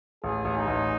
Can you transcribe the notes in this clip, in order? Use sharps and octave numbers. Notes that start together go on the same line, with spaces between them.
A1 G#4
A1
D#4
A1